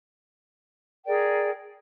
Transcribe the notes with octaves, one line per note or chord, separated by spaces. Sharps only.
G#4 A#4 D5 G5